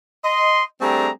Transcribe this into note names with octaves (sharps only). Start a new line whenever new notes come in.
D#5 C6
G3 A3 C4 D4 G#4 A#5